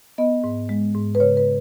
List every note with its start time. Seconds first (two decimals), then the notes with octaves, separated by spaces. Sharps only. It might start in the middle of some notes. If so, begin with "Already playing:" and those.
0.18 B3 D#5
0.44 G#2
0.69 G#3
0.95 G#2
1.15 B4
1.20 C#3 C#5
1.37 B4